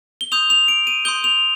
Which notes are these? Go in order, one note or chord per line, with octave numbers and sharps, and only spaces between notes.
G7
C6 D#6 G6 F7
F7
D7
D#7
C6 D#6 G6 G7
F7